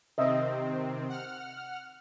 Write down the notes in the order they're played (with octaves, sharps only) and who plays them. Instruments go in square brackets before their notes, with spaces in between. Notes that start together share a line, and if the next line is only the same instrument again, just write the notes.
[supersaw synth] C3 D#3 C4 [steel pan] D#5 E5
[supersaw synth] F#5 F6